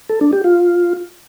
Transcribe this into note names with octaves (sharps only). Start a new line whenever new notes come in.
A4
D4
G4
F4